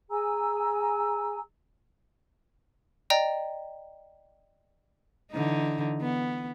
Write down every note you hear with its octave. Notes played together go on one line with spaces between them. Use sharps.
G#4 G#5 A#5 E6
D5 D#5 G5 A#5
D3 E3 D#4
B3